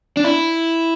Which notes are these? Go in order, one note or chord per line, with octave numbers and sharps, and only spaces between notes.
D4
E4